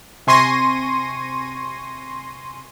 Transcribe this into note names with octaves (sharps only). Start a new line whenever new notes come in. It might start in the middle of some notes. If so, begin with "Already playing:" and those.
C3 G#5 C6 C#6 A#6 D#7